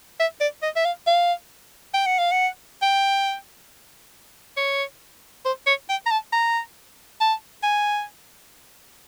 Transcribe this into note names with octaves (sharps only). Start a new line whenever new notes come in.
E5
D5
D#5
E5
F5
F5
G5
F#5
F5
F#5
G5
C#5
C5
C#5
G5
A#5
A5
A#5
A5
G#5